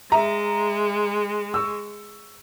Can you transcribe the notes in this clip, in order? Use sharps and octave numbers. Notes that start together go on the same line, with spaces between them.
G#3 E5 A#5
C#6 E6